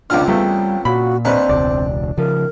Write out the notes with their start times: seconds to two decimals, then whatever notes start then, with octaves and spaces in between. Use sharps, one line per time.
0.10 C#2 C#3 F3 C4 D4 F6
0.28 E2 G3 A3 G5
0.85 A#2 F#4 B5
1.25 D#2 C4 D4 B4
1.49 E1 C#2 D5
2.18 C#3 F3 A#4